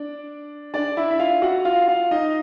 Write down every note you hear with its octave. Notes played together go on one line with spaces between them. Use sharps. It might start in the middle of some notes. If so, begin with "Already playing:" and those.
Already playing: D4 D5
D4 D5
E4 E5
E5
F4 F5
F#4 F#5
F4 F5
F4 F5
D#4 D#5